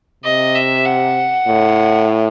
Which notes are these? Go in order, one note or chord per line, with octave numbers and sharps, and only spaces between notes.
C3 D#5
E5
F#5
A2